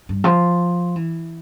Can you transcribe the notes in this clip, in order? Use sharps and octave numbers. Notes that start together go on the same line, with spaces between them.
G2
F3
E3